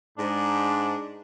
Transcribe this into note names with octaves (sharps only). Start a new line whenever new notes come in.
G#2 D4